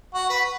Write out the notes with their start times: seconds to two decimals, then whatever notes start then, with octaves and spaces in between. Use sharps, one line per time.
0.15 F#4
0.30 B4